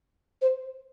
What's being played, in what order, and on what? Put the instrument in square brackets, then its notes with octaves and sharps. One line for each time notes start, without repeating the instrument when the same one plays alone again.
[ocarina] C5